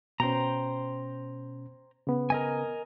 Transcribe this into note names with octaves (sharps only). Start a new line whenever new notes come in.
B2 C#4 C5 G5 A#5
C#3 B3
A#4 D#5 G#5